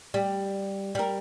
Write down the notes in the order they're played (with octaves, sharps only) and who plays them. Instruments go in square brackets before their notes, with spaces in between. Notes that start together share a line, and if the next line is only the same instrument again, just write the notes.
[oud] G3
G3 A#4